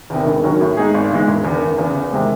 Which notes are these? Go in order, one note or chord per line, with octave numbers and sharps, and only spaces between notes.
E2 C3 D#3
E1
D#2 D#3 F#3 C#4
A2
G#3 D#4 G#4
G#1
G#2 E3 G#3
E1
E2 D#3
F#1
E2 C#3 E3
E2
C3 D#3 G#3 C4